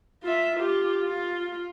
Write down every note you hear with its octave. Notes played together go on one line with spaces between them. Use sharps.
F4 E5
F4 G4
F4